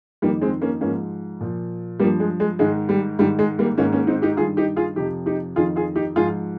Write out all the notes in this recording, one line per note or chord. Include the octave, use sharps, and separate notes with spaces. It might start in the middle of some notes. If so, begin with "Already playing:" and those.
F2 D#3 G3 A#3
G#3 C4
A#3 C#4
G#2 F3 A#3 C#4
A#2 F3
G2 F3 G3 A#3
G#3
G#3
G#2 D#3 G#3
G3
G#2 D#3 G3
G#3
G3 A#3
G#2 D#3 A#3 C#4
A#3 C#4
C4 D#4
D#4 G4
G2 D#3 F4 G#4
D#4 G4
F4 G#4
F2 C3 F3 D#4 G4
D#4 G4
F2 D#3 F4 G#4
F4 G#4
D#4 G4
G#2 F3 F4 G#4